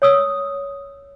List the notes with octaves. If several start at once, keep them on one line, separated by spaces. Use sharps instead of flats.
C#5 D#6 E6